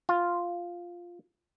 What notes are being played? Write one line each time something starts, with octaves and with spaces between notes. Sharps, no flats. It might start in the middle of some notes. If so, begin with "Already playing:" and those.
F4